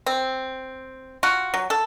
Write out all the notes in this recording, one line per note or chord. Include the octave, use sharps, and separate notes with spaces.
C4
F4 F#4
F#3
A4